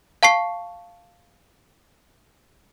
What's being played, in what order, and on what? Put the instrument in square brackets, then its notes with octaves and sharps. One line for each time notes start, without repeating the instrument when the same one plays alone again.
[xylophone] F5 A5 C#6 C7